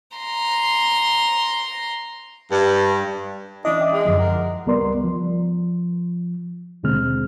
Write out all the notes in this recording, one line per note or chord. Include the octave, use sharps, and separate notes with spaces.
A#5 C6
G2
E3 C#4 D4 E4 D#5
E5 G5 D6
G#3
F#2 D3 F3
A#4 F#5
C#2 G3 B3 A#4 D5 C6
F3
D#2 B2 D3 G#3 C4 F6